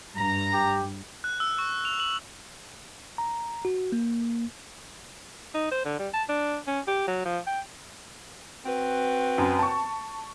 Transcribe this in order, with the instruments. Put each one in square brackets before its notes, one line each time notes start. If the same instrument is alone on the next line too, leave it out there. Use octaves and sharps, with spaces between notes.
[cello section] G2 [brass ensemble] A#5
[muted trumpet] G4
[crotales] F#6
E6
C#6
F7
F#7
[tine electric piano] A#5
F#4
A#3
[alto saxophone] D#4
C5
D3
G3
A5
D4
C#4
G4
F#3
F3
G5
[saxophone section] C4 F#4 B4
[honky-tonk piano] F#2
A5 C#6